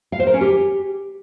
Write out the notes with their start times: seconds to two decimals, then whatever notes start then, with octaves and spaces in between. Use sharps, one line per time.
0.12 F5
0.20 C5
0.27 A#4
0.34 C#4
0.41 G4